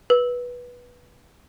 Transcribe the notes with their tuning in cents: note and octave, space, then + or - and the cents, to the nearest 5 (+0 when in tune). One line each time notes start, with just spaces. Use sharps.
B4 -15